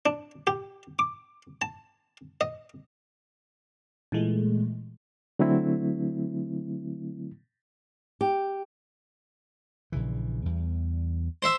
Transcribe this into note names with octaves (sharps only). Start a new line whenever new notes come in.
D4
G4
D6
A5
D#5
A#2 E3 G#3 A3
D3 F#3 A3 C4 E4
G4
A#1 C#3 E3
E2 G3
C5 E5